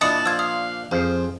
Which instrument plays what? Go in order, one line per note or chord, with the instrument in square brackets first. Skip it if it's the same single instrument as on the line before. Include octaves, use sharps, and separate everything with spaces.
[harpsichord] A#2 D4 [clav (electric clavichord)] E4 [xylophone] D#5 D#6 C#7 [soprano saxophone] A5
[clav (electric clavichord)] F3 F4 [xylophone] E6 G#6
[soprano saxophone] F5 [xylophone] D#6
[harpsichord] F2 [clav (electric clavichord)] F3 G#4 F5 [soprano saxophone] C5